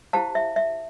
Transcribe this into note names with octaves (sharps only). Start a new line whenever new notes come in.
E4 G4 C5 F5 A5
E5
E5